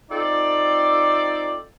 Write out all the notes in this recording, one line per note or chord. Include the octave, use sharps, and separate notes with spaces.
C4 D#4 F4 A4 D5